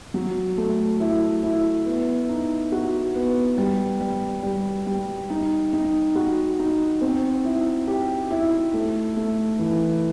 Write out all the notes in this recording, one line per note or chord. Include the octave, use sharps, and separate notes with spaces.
F#3
A3
E4
E4
B3
D#4
F#4
B3
G3
G3
G3
G3
D#4
D#4
F#4
D#4
C4
E4
G4
E4
A3
A3
E3